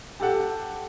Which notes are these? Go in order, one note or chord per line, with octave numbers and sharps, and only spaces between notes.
G4 A4 F#5